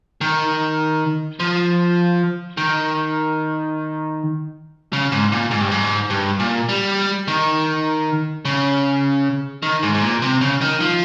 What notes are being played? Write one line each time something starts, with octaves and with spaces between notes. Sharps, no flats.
D#3
F3
D#3
C#3
G#2
A#2
G#2
G2
G#2
G2
A#2
G3
D#3
C#3
D#3
G#2
G#2
A#2
C3
C#3
D#3
F3